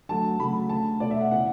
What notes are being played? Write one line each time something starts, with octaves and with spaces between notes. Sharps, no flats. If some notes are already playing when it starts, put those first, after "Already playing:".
D3 F#3 A3 A5
C#3 F#3 A3 B5
D3 A3 A5
B2 A3 D5
E5
F#5
C#3 E3 B3 F#5